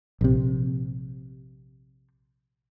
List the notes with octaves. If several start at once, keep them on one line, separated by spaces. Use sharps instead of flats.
A#1 C3